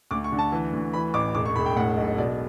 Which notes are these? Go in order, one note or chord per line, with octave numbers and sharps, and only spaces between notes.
D2 D6
C#6
D3
A5
E3
D2
E3 B5
A1 D6
E1 D6
C#6
E1 B5
G5
A2 F#5
B1
B2 D5